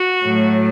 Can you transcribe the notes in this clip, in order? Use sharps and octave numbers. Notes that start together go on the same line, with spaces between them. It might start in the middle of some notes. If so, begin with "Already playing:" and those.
Already playing: F#4
A2 F#3 A3